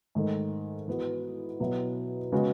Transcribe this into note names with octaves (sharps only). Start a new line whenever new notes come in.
G#2 D#3 A3
E3 B3 F#4
B2 F#3 B3 E4
C#3 G#3 B3 F#4